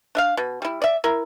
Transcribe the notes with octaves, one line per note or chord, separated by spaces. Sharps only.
D4 E5 F5
B2
G3 E4
D5 E5
E4 A#4